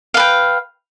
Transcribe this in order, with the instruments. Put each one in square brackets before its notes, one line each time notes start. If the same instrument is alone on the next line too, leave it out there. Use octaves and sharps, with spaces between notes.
[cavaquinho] F5
B4
G5